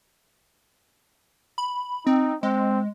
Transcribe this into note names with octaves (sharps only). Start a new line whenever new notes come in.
B5
C4 D#4
G#3 C4